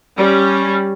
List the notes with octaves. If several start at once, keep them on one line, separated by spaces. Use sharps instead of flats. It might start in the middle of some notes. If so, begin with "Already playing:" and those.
G3 C#4